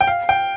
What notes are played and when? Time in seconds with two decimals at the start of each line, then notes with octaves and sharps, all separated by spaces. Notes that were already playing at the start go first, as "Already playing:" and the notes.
0.01 G5
0.07 F5
0.29 G5